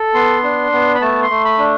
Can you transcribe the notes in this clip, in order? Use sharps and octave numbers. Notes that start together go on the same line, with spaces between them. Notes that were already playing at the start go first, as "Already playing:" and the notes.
Already playing: A4
B3 C6
D4
B3
B5
A3 A5
C6
A3
B5
D4